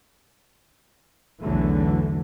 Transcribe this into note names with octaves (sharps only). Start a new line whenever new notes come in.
B1 E2 D3 E3 F#3 A3